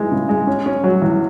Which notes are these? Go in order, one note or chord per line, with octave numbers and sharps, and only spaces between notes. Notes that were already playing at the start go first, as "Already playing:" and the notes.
Already playing: E3 G#3
C#3
G#3
C#4
C#4
F#3
E2